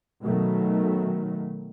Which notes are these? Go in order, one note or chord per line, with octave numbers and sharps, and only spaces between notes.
B2 D#3 F#3 A3